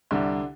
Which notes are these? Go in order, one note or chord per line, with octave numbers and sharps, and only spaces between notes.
C2 D3 D4